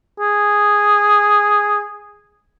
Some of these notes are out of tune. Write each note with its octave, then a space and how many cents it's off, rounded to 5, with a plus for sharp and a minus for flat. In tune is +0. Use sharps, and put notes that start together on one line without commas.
G#4 -5